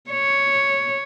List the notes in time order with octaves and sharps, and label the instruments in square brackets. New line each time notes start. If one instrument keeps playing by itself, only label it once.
[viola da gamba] C#5